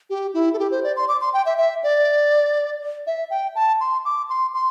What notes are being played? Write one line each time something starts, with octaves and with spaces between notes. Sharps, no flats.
G4
E4
A4
G4
C5
D5
C6
D6
C6
G5
E5
E5
D5
E5
G5
A5
C6
D6
C6
C6